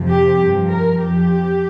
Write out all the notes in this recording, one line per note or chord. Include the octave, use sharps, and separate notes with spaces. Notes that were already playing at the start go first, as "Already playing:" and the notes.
Already playing: F2 C3 F3
G4
G2 F3
A#4
F2 F3 G4